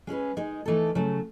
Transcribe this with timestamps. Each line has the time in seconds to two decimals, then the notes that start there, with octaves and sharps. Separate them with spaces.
0.07 G#3 C#4 G#4 B4
0.37 G#3 D#4 G#4
0.66 E3 A3 D#4 A4
0.95 C#3 F#3 A3